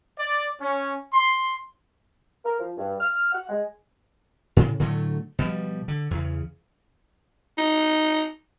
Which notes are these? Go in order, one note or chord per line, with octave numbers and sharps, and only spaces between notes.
D5
C#4
C6
A#4
F3
G2
F6
F#5
G#3
A2 C#3
A2 D3 F#3 A3
B2 F3 G3
D3
E2 C#3
D#4